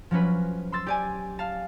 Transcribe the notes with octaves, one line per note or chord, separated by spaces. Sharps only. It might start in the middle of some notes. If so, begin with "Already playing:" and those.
F3 F#3 C#4 B4
C6 E6 A6
G4 D5 G#5
F5 A5